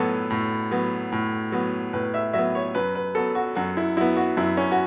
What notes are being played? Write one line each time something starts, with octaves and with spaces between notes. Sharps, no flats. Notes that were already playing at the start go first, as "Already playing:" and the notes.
Already playing: A2 F#3 B3 F#4 A4
A2
F#3 B3
A2
F#3 B3
A2 B4
E5
F#3 B3 E5
C#5
F#2 B4
B4
F#3 B3 A4
F#4
F#2 F#4
E4
F#3 B3 E4
F#4
F#2 E4
C#4
F#4